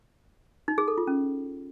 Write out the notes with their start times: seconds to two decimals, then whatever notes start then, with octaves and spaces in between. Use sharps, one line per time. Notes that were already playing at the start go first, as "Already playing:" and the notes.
0.68 D#4
0.78 G#4
0.88 A4
0.98 F4
1.07 C#4